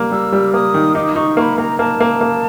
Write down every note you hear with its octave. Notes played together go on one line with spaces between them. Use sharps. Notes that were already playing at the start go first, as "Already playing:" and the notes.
Already playing: G3 A#3
G3 E6
G3
A#3 D#6
D#3
D#4 D6
D#4 C#6
A#3 B5 C#6
A#3 A#5
A#3 A5
A#3
A#3